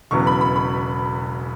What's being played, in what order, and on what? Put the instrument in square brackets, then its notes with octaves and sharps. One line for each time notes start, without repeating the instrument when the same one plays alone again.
[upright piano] E1 E2 C#3 F#3 B3 C#6
B5
B5
B5